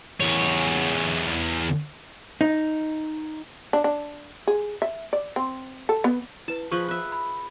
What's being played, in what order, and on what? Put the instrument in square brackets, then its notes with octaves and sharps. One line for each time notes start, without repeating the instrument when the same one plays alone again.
[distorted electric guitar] E2 C#5
[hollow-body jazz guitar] D#4
[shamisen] D4
D4
G#4
E5
D5
C4
A4
B3
[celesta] E4 B4 [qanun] A5
[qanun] F3 G#4 B4 [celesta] C#6
[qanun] B4 E5 [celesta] F#6
[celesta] B5